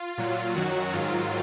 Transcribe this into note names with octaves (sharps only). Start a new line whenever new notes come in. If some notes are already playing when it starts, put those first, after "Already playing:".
Already playing: F4
A#2 F#3
F#2 D#3 F#3 F#4
G#2 D#3 F#3 F4